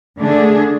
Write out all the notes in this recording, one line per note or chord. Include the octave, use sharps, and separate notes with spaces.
D3 A3 D4 G#4